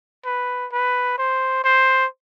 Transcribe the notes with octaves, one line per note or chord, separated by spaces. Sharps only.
B4
B4
C5
C5